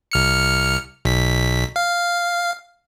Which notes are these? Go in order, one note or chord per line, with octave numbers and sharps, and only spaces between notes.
C2 F6 C#7
B1 B6
F5